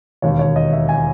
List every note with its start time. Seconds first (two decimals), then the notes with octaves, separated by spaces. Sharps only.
0.22 E1 D#2 D#3 C#5
0.39 C#5
0.56 D#5
0.73 E5
0.89 G#5